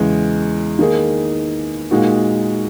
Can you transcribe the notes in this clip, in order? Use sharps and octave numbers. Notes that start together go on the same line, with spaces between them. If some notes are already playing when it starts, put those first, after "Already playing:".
Already playing: E2 C#3 G#3
D#3 A#3 D#4 G#4
A#2 G#3 D#4 F#4